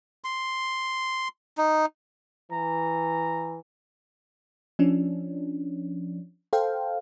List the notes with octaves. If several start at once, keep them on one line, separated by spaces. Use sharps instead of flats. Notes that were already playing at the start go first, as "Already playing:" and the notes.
C6
D#4
E3 A#5
F3 C#4 D4
A4 C5 F5 G5